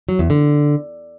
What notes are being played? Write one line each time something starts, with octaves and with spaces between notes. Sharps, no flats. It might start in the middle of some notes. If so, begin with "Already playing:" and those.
F#3
E2
D3